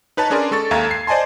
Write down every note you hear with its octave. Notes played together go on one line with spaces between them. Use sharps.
D#4 B4 C#5 A5
C#4 D4 G#4 A#4 D5 C6
G#3 A4 C#6 A6
D#2 A4 E5 F5 A#5 G#6
C7
C5 D5 D#5 G#5 A5 C6